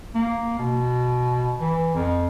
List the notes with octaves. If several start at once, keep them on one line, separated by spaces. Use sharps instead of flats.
A#3
B2
E3
F2